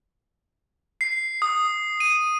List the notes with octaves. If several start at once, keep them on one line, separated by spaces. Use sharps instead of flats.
C7
D#6
D#7